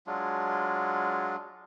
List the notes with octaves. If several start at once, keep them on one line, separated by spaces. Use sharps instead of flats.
F#3 G#3 D4 F4